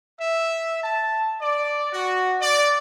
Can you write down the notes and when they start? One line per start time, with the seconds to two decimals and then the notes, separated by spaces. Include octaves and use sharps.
0.19 E5
0.83 A5
1.41 D5
1.93 F#4
2.41 D5